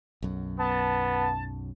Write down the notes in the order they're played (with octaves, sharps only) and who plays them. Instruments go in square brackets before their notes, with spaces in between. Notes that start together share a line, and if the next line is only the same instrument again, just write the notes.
[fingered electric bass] B1 F#2
[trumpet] B3 [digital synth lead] A5